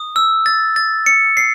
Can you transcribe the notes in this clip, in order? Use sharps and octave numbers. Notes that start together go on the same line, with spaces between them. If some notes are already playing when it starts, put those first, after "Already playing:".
Already playing: D#6
E6
A6
A6
C#7
C7